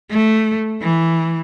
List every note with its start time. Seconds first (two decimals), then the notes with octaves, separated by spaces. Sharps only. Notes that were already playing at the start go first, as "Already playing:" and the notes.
0.11 A3
0.82 E3